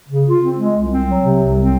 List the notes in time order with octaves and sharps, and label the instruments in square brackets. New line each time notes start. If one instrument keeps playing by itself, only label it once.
[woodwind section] C#3
F4
C4
G#3
C2
C4
F#3
C3
C2
C4